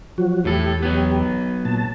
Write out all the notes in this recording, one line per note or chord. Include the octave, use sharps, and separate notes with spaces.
F3 F#3 F#4
E2 A2 G4 A4
F#3 B3
A#2 A5